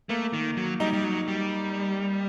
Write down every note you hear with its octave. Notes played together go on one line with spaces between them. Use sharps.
A3 A#3
D#3
F#3
G3 D#4
G3
F#3
G3